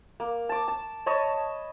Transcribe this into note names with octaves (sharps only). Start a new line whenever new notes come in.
A#3
A5 D6
A5
C#5 D#5 A5 B5